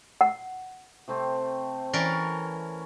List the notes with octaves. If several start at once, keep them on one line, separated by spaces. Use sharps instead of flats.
F#5
C3 A3 C4
E3 C#4 A#4 D5